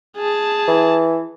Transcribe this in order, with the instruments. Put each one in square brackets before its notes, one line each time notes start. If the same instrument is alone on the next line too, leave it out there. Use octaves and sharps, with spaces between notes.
[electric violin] G#4 A5
[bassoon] E3